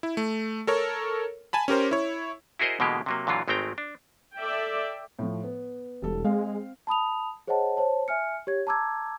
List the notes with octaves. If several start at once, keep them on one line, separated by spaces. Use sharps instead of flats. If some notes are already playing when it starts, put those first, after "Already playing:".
E4
A3
A4 A#4 C#5
G#5 A5 B5
C#4 G4 A#4 C5
E4 C#5
E4 F#4 G#4 A#4 C5 D#5
B2 D3 E3 G#3 A#3 G4
C3 F#3 A#3
A#2 D3 E3 F#3 F4
G#1 G#3 A3 C4 G5 A#5
D4
A4 D5 E5 G5
A2 F3
B3
E1 G3 A4
G#3 C4 F5
A5 B5 D#6 F7
G#4 C5 C#5 D#5 F#5 A5
C5 C#5 A5
E5 G#5 F6 C#7
G4 C#5 G#6
A5 A#5 D6 E6 G#6